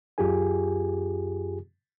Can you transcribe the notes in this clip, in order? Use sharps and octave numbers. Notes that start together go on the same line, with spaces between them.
F#2 F4 G4 G#4 G#5